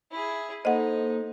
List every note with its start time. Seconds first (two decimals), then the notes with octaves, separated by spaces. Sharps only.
0.11 E4 G#4
0.65 A#3 D#4 A4 C5 D#5 F#5